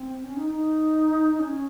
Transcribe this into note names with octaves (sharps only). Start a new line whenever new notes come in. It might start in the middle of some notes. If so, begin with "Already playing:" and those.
Already playing: C4
C#4
D#4
D#4
C#4